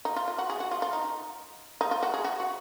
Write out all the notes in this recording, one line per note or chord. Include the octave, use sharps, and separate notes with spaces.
D#4
F4
F4
F#4
G#4
F#4
F4
F4
D#4
D#4
F4
F#4
G#4
F#4
F#4